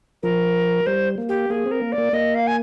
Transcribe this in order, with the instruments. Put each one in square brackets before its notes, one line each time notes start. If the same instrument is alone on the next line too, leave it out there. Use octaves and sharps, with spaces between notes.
[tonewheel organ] F3 [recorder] A#4
[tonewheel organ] G3 [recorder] C5
[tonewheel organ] A#3
[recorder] G4
[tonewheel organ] A#3 [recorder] G#4
[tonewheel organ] C4
[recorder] A#4
[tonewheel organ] A#3
[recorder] D5
[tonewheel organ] A#3
[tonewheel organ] A#3 [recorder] D#5
[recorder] F5
G#5